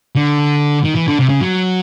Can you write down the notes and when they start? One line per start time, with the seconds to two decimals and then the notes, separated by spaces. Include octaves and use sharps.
0.15 D3
0.84 D#3
0.95 E3
1.08 D3
1.19 C3
1.29 C#3
1.41 F#3